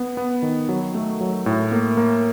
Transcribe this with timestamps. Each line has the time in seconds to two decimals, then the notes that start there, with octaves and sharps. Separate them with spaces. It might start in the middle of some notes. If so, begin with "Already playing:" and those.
Already playing: B3
0.17 B3
0.42 D#3
0.69 F#3
0.95 A3
1.21 F#3
1.46 A2
1.72 A#3
1.97 A#3